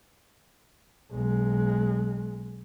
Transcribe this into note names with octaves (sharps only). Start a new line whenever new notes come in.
B1 G#3